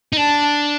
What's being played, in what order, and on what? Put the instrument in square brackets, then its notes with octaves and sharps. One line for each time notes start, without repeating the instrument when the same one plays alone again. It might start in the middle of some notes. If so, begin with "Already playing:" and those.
[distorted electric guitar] D#4
[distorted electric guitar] D4 [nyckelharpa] A5